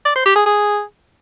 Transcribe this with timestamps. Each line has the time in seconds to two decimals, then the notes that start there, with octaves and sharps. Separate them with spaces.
0.05 D5
0.16 C5
0.26 G4
0.36 G#4
0.46 G#4